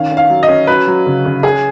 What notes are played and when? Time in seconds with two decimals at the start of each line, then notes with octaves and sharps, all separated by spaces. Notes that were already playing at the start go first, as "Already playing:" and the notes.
Already playing: D#3 C#4 F5
0.12 C#4
0.17 F5
0.30 F#3
0.43 D#5
0.48 C#4
0.67 F#3 B4
0.87 F#3
1.06 C#3
1.25 C#3
1.43 C#4 G#4